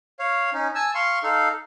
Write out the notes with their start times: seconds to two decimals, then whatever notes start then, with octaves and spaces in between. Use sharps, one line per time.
0.19 C#5 F5
0.53 C#4 D#4
0.75 G#5 A5 E6
0.95 F5 C6 C#6
1.23 D#4 A4 F5